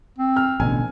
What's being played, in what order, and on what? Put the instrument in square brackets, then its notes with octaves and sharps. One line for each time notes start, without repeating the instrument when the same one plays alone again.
[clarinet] C4
[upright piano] F6
[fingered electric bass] A1 B2 D3 [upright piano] G#5